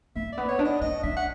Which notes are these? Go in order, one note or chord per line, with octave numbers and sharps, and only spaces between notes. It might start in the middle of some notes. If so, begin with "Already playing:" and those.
A#3 E5
D5
B3
C#5
D4
D#5
C#4 D#5
D4 E5
F#5